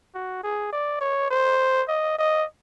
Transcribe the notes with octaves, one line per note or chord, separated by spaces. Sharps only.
F#4
G#4
D5
C#5
C5
D#5
D#5